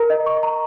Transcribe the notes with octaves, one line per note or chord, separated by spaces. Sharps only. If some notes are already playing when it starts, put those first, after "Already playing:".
Already playing: A#4 A#5
D#5
C#6
A#5